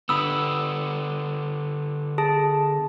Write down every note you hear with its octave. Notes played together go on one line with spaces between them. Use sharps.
D3 B3 B5 D#6 E6
G#4 A5